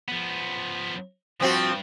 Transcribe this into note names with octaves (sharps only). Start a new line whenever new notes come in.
F3 B3
G2 F3 C4 F#4